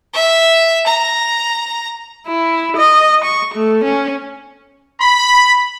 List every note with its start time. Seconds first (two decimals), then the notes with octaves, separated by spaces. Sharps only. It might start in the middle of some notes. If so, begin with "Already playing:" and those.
0.14 E5
0.86 A#5
2.27 E4
2.77 D#5
3.25 C#6
3.54 A3
3.84 C#4
5.01 B5